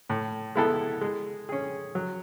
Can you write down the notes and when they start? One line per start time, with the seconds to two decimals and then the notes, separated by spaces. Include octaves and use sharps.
0.10 A2
0.55 G#3 B3 E4 A4
1.01 G#3
1.49 C#4 G#4
1.95 F#3